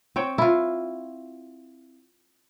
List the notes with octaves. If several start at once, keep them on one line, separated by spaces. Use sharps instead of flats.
C4 C#5 G5
E4 F4